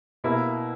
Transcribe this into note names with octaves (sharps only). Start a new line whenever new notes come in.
B2 A#3 E4